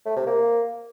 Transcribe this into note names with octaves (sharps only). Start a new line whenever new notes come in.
A3
C3
A#3